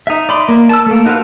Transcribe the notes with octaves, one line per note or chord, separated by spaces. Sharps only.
D#4 E5
D5 B5 C6
A#3
A5 E6
A3 A#3
D#4 F#4 B4 C5 F5